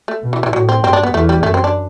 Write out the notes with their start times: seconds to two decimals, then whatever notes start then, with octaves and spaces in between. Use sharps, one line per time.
0.08 A3
0.23 B2
0.33 E3
0.43 E3
0.53 A2 F#3
0.69 C4
0.83 G2 C4
0.93 D4
1.03 B3
1.14 E2 A3
1.29 G3
1.43 F#2 A3
1.54 C4
1.64 D4